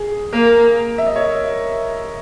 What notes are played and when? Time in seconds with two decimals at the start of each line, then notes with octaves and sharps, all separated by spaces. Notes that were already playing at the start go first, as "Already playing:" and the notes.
Already playing: G#4
0.33 A#3 A#4
0.98 E5
1.06 D#5
1.16 C#5